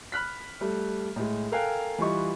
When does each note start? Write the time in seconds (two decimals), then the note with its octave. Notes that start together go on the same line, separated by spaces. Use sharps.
0.12 B5 F6 F#6 B6
0.61 G3 A3
1.16 A2 G#3
1.52 A4 A#4 F5 G5 G#5 F#6
1.98 E3 G3 F4 D#5 C#6